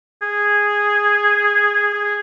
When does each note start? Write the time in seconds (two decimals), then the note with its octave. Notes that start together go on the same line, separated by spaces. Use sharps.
0.22 G#4
1.94 G#4